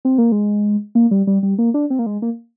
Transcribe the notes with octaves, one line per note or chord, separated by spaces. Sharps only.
C4
A#3
G#3
A#3
G3
G3
G3
A#3
D4
C4
A#3
G#3
A#3